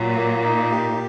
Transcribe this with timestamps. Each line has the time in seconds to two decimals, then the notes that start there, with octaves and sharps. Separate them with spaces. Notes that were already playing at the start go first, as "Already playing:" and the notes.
Already playing: A#2 F#3
0.15 A#3
0.43 D#4
0.71 G4